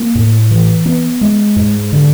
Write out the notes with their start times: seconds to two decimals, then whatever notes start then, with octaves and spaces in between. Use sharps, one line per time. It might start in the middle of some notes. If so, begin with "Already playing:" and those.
Already playing: A#3
0.15 A2
0.51 E3
0.85 B3
1.21 G#3
1.56 G#2
1.92 D3